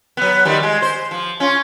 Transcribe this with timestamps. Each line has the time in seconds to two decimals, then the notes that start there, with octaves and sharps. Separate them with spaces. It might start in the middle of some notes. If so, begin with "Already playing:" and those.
0.17 F#3 B3
0.45 D#3 F3 G3
0.63 G#3
0.82 C5
1.11 F3
1.40 C#4 F4